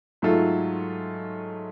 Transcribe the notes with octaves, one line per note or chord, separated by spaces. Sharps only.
G#2 F#3 A3 F4 A4